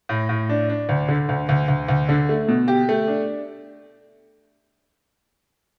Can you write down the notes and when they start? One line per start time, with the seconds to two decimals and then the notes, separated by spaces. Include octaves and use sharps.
0.09 A2
0.29 A2
0.49 D4
0.70 D4
0.89 D2
1.08 D3
1.29 D2
1.49 D2
1.68 D2
1.88 D2
2.09 D3
2.29 A3
2.48 B2
2.68 G4
2.89 A3
3.08 D4